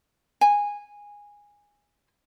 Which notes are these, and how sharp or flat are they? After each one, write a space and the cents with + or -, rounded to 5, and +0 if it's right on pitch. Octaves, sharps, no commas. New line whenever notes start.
G#5 -15